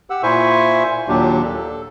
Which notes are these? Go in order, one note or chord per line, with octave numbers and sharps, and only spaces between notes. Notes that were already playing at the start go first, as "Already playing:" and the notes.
G4 F#5 E6
A#2 E4 C5 E5 G#5 C#6
D#2 A#2 F#3 D4 G4
A4